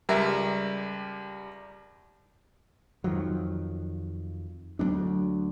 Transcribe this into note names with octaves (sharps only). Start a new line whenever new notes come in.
C#2 G3 A#4 E5
F2 D#3 F3 F#3
D2 F#3 B3 D4